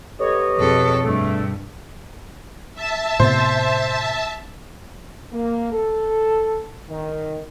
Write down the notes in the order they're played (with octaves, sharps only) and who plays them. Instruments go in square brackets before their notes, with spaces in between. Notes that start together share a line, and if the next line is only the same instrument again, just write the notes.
[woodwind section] B3 G4 D#5 [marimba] A4 [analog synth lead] C#5
[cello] F2 A4 [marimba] B2 G#4
[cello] G2 [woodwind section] A3
[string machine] E5 A5
[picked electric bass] A2 C3 B3 [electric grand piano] C5 C6
[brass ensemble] A#3
A4
D#3